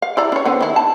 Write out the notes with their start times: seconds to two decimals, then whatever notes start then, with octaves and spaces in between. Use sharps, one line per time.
0.02 F5
0.17 E4 D5 A#5
0.32 C#4 C#5
0.45 D3 B3 C4
0.61 D#3 E4
0.76 A5